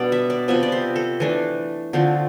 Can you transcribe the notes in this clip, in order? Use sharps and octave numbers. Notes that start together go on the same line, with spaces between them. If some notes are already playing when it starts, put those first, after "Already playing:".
Already playing: B2 G3 B3 D4 D5
E5
D5
C3 F3 B3 E5
D5
C5
A4
E3 A3 D4
D3 F3 A3 C4